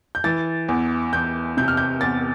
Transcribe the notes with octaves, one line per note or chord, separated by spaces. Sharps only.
G6
E3 A6
E2
E2 G6
C3 G6
F6
G6
E2 A6